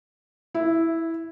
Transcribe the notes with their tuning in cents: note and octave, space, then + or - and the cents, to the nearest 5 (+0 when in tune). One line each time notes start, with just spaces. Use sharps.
E4 -5